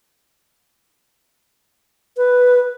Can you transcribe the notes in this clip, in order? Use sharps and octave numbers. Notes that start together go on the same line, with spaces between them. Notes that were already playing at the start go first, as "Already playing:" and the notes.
B4